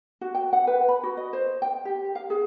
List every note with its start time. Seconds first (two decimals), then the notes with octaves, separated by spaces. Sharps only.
0.21 F#4
0.35 G5
0.53 F#5
0.67 B4
0.88 B5
1.03 F#4
1.17 D#5
1.33 C5
1.62 G5
1.85 G4
2.15 F5
2.30 G#4